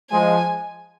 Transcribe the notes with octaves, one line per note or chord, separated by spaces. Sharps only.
F3 G#3 G#5